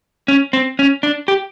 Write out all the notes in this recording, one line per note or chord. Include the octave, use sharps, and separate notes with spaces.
C#4
C4
C#4
D4
G4